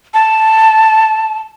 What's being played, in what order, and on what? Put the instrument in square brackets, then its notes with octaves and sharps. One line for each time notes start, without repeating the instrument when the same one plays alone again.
[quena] A5